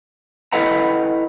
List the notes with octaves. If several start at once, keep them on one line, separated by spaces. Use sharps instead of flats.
E4 A4 B4 D#5 F#5 A#5